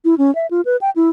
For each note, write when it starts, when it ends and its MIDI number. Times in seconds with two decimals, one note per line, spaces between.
0.05 0.15 64
0.18 0.33 61
0.35 0.46 76
0.51 0.61 65
0.65 0.77 71
0.81 0.90 79
0.96 1.10 64